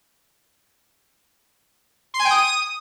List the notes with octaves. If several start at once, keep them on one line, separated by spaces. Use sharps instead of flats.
C6
G#5
G5
D#6